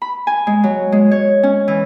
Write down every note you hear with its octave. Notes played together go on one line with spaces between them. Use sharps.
B5
G#5
G#3
F#3
G#3
C#5
C#4
E3